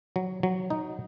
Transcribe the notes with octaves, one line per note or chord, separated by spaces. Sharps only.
F#3
F#3
D#4